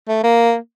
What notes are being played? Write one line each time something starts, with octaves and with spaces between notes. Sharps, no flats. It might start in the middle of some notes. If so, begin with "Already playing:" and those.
A3
A#3